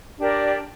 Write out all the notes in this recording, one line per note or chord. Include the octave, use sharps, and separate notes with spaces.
D4 G4 A#4 D5